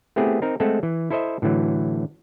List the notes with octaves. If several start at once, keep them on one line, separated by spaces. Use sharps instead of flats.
A3 B3 C4 E4 G4 G#4
C4 D#4 A#4
G#3 A3 C4 A4 F#5
E3
E4 A4 C5 D#5 E5
A2 D3 E3 F#3